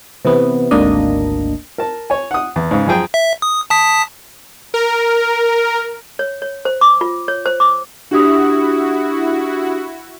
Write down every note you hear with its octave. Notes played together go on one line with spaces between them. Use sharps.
C3 E3 B3
G#1 D2 A#3 D4 D#5
A#4 A5
C#5 G#5
F#5 D#6
E2
G#2 C#3
F#2 F3 G#4 G5 A#5
E5
D#6
A5 D#6 B6
A#4
C#5
C#5
C5
D6
F4
C#5
C5
D6
D4 E4 F#4 G4 D#6